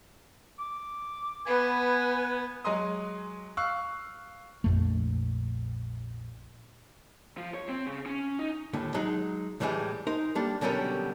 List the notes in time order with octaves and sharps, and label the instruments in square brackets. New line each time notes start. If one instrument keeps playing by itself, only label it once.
[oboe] D6
[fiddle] B3 [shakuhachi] B4 [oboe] G#5
[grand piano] F#3 G#3 G#5 A#5 C6 D#6
F5 C#6 E6 F#6
[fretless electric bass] A#1 F2 A3
[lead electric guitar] F3
C#5
C4
C#3
C#4
D#4
[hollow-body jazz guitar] D#2 A2 D3
F#3 G#3 D#4
C2 A2 E3 G3 G#3 G#5
D#4 A#4 C5
G3 A#3 D4 A4
B2 D3 F#3 G3 C#4 A#4